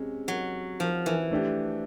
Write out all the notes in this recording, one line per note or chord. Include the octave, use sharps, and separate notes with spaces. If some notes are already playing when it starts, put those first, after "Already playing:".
Already playing: C3 G#3 C#4
F#3
F3
E3
A3 D4 G4